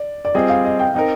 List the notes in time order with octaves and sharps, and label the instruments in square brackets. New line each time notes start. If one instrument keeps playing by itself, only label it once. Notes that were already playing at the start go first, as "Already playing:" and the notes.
Already playing: [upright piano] D5
D5
[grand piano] G3 C4 F4 G#4 [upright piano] D#5
[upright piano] F5
D#5
G5
[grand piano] C4 D#4 A#4 [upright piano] G5